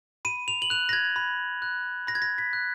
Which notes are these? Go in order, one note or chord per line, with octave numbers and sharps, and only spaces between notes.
B5 D#7
F7
F#7
F#6 F7
A#6
G#6
B5
F#6
B5 A#6
G#6
A#6
B6
F#6